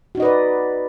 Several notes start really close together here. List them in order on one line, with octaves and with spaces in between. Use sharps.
F#4 D#4 D#5 B4 D5